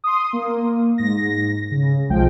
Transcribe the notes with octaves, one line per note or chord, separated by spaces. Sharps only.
C6 D#6
A#3
G#2 A#6
C#3
B1 F3 G#3 G5